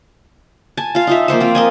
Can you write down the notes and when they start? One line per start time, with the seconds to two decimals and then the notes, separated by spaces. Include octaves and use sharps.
0.77 G#5 A5
0.95 F4 F5
1.07 D#4 F4 E5
1.28 F3 A#3 C5 E5
1.40 C4 F4 F5
1.55 A#4 D#5 G#5